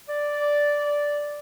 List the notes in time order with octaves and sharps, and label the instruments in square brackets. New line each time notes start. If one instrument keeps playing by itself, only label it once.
[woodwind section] D5